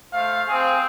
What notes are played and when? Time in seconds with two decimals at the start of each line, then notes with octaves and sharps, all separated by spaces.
0.12 A3 C5 F5
0.48 C4 G#4